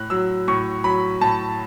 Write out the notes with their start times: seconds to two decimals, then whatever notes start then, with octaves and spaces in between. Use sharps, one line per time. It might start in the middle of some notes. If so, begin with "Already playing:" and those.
Already playing: A2 F#6
0.10 F#3 E6
0.48 A2 C#6
0.84 F#3 B5
1.21 A2 A5